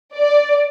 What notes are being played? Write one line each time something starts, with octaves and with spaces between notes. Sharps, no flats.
D5